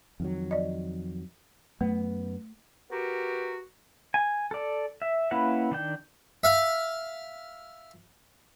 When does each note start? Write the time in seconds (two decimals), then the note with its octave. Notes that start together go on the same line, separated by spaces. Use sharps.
0.20 F2 D#3 F#3
0.51 D5 D#5
1.81 F#2 A3 B3
2.90 B3 F#4 G4 A#4
4.14 G#5
4.51 A4 D5
5.02 E5
5.31 A#3 C#4 E4 B4 F#5
5.71 D#3 D4 G5
6.44 E5 F5